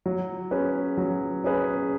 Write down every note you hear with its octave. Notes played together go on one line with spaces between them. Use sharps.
F#3
C#4 G#4 B4
F#3
C#4 G#4 B4